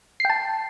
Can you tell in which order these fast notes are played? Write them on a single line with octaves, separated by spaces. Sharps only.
C7 G5 A5